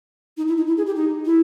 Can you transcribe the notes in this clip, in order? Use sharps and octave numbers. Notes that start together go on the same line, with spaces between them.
D#4
E4
D#4
E4
G#4
G4
D#4
E4